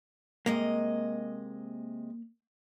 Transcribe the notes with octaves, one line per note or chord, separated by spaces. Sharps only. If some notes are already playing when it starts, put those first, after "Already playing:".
C3 G#3 A#3 D#5